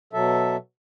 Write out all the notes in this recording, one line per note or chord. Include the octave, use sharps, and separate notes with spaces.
B2 F#3 A4 E5